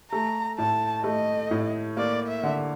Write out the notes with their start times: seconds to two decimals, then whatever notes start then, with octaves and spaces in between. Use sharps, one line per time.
0.11 A3 A#5
0.58 A2 A5
1.04 A3 D#5
1.51 A2
1.97 A#3 D5
2.27 E5
2.43 D3